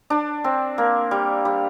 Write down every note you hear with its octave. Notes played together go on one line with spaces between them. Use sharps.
D4
C4
A#3
G3
G3